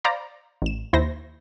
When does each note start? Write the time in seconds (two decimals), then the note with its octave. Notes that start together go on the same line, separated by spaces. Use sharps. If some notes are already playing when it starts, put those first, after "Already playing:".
0.04 C5 D5 F5 A#5 B5
0.62 A1 E7
0.93 D#2 E4 C5 A#6